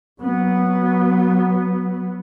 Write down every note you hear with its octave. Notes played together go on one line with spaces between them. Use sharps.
F#3 B3